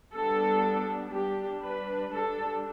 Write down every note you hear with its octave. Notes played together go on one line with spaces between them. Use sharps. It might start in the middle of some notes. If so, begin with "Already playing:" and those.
G3 B3 D4 A4
G3 D4 G4
B4
G3 D4 A4